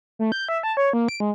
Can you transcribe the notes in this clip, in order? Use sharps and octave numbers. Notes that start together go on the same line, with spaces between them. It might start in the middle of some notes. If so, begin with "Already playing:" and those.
A3
G6
E5
A5
C#5
A#3
D7
G#3